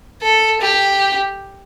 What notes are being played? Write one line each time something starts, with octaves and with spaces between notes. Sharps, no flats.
A4
G4